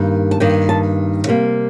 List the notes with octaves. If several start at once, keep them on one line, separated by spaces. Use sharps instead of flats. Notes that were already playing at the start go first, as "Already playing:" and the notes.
Already playing: G2 D#3 A#3
A5
G2 D#3 A#3 G5
A5
C3 G3 A#3